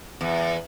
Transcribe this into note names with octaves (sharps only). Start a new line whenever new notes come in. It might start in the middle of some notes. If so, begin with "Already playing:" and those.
E2